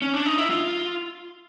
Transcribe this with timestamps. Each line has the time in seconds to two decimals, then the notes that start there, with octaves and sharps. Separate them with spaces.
0.02 C#4
0.14 D4
0.26 D#4
0.38 E4
0.50 F4